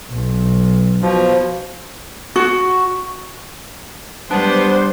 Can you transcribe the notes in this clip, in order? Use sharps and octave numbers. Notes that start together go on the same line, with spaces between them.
B1
B2 F3
F#4
G3 B3 D4 C5